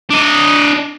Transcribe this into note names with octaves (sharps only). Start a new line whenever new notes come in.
D4 D#5